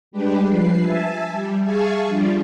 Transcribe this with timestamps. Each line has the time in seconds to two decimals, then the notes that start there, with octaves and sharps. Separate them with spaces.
0.11 G3 G#3 D4 G4 B4
0.48 F3 B4 C7
0.81 E5 G#5 A5
1.30 G3
1.64 G#4 E5 F5 G#5 A5 C#6
2.06 F3 G3 D4 F4